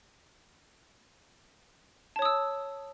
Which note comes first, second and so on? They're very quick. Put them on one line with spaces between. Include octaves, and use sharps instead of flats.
A5 C#5 D#6 E6